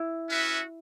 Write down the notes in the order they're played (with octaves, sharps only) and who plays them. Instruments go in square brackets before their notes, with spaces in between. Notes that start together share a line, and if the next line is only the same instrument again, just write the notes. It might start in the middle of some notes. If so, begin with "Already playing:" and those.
Already playing: [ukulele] E4
[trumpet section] C#4 F#4 B4 E5